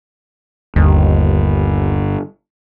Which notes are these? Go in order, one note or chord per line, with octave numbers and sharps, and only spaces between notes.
G1 D#2